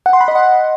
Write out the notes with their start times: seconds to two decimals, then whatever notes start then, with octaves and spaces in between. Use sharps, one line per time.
0.06 F#5
0.13 C6
0.21 B5
0.28 D#5
0.35 F#5